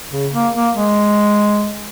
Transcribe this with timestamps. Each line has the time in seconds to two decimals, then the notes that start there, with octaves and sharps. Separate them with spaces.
0.11 C#3
0.33 A#3
0.55 A#3
0.76 G#3